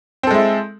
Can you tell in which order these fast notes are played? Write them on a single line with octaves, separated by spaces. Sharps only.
C4 A4 G#3 E4